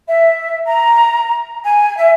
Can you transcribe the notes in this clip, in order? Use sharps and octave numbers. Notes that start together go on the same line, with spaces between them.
E5
A#5
G#5
E5